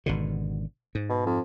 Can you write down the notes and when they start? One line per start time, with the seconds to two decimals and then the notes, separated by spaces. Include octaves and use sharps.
0.06 G#1 B2 D3
0.95 G#2
1.10 B2
1.26 F2